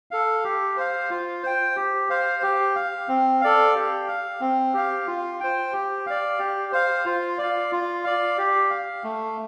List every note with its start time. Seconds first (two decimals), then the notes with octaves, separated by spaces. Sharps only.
0.11 A4 F5
0.44 G4
0.77 C5 F5
1.10 F4
1.43 C5 G5
1.76 G4
2.10 C5 F5
2.42 G4
2.75 F5
3.08 C4
3.41 A4 D5 F5
3.75 G4
4.08 F5
4.41 C4
4.74 G4 F5
5.07 F4
5.40 C5 G5
5.73 G4
6.06 D5 F5
6.39 G4
6.72 C5 F5
7.05 F4
7.38 D5 F5
7.72 F4
8.04 D5 F5
8.38 G4
8.70 F5
9.04 A3